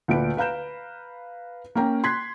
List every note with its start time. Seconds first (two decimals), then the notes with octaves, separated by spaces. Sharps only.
0.08 D2 A#2 B4 D7
0.37 B4 F5 A#5 G6 E7
1.75 A#3 C#4 G5 A#5
2.04 C6 F#6 G#6 B6